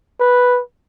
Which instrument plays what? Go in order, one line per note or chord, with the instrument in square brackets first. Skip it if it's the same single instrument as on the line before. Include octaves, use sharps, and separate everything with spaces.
[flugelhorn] B4